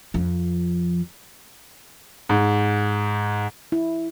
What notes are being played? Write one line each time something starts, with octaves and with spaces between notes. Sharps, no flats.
F2 F3
G#2
E4